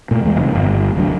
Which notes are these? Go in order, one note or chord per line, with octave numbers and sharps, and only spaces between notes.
A#2 A3
D1 E2 G3 G#3
F1 F2 D#3
G1
F1 D2 F#3 D4